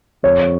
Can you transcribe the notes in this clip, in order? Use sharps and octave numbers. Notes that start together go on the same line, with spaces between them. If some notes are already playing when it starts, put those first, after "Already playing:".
F2 C#5